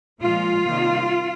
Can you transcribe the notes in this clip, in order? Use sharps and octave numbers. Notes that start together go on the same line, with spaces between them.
A#2 F3 G#3 F4
C3 D#3 G3 A#3